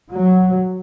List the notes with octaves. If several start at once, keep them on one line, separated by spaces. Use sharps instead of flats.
F#3